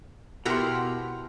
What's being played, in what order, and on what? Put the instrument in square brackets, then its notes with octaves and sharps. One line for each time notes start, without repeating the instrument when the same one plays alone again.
[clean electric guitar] B2 [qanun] E4 G4 A#4 [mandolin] F#5 C6